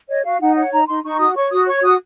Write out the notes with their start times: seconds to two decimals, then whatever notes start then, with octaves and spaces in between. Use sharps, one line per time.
0.08 C#5 D#5
0.24 F#4 F5
0.41 D#4 F#5
0.56 C#5 F#5
0.72 D#4 A#5
0.88 D#4 C6
1.04 D#4 C#6
1.19 F#4 D#6
1.36 C#5 C#6
1.50 F#4 D#6
1.66 C#5 C#6
1.83 F#4 D#6